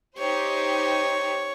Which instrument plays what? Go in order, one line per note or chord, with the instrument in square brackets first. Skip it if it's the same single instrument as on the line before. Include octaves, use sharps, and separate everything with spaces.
[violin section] D#4 G4 C5 [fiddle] C#5